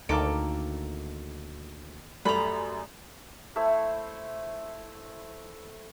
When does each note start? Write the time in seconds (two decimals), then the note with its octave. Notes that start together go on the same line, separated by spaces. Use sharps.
0.09 D2 D#3 A#3 A4 D6 D7
2.25 F#2 G3 A3 A#5 B5 F#7
3.56 A3 E4 C5 E6